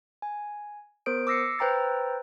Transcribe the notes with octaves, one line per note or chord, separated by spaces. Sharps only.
G#5
B3 A#4 C5 D#6 D7
D6 E6 A#6 C7 C#7
B4 C5 G5 A#5 E6 A6